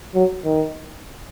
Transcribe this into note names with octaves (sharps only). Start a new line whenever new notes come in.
F#3
D#3